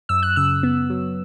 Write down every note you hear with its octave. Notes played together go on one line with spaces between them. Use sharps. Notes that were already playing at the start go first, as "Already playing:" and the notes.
F#2 E6
F#6
C#3 E6
B3
F#3